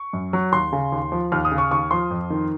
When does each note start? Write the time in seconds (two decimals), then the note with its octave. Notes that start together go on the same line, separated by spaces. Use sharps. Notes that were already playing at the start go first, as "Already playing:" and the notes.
Already playing: C#6
0.13 F#2
0.33 F#3
0.52 D#2 C6
0.73 C#3
0.92 D#2
1.12 F3
1.32 D#2 F6
1.45 D#6
1.52 C#3
1.58 C#6
1.71 D#2 C#6
1.91 F3 C6
2.11 F2
2.30 D#3